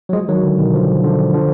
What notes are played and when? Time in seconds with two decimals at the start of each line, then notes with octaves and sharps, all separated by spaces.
0.09 F#3
0.13 F3 G#3
0.28 D#3 F#3
0.43 D3
0.59 B2 D#3
0.73 D3 F3
1.04 D3 F3
1.34 D3 F3